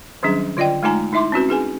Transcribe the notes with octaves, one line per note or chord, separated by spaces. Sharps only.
D#3 F#3 G3 C#4 D4 G#4
D3 F4 D5 D#5 G5
G#3 A3 D#4 F4 G#5 A#5
D#4 E4 E5 C6 D6
C4 C#4 F#4 B4
D#4 G#4 B4 G#5